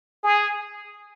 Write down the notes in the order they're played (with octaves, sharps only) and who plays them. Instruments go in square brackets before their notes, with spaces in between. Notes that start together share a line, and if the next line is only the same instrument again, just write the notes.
[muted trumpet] G#4